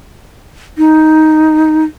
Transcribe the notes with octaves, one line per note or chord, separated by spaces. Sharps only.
D#4